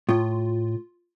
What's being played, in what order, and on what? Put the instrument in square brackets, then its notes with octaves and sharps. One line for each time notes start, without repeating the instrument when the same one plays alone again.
[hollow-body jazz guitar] A2 [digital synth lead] F4